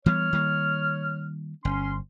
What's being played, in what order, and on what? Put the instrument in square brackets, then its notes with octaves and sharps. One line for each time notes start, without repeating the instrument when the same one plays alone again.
[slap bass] E3 G3 B3 [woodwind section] C#5 F6
[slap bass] D#3 G3 A#3
[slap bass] G1 [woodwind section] C#4 C6